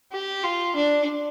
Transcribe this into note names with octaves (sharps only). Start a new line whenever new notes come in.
G4
F4
D4